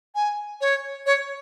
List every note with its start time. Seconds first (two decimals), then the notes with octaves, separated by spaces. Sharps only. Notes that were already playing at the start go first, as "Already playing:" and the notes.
0.15 G#5
0.61 C#5
1.06 C#5